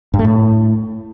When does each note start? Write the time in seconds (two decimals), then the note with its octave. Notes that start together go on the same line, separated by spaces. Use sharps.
0.14 G2
0.19 A3
0.25 A2